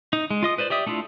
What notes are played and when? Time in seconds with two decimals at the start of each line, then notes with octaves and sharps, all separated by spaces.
0.13 D#4
0.30 G#3
0.43 F4 D#5 D#6
0.58 B4 C5 D5
0.70 G4 D5 E5 D#6
0.87 A3 D4 E4 F4